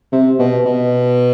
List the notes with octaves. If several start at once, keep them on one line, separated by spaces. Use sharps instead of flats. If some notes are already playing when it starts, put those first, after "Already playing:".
C3
B2
B2